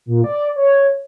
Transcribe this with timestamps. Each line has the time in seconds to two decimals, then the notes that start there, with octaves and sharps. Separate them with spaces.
0.06 A#2
0.24 D5
0.56 C#5